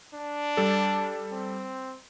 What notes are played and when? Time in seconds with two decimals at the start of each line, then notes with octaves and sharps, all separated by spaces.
0.14 D4
0.57 G3 A4
1.32 C4